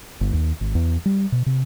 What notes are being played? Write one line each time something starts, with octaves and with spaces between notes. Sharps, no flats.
G1
D#2
G#1
E2
G3
B2
C3